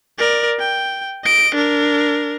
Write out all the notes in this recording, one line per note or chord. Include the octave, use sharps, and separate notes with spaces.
A#4 D5
G5
D#5 D7
D4 A#4